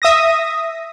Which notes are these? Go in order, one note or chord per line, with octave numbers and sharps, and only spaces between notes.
E5 D#6 A#6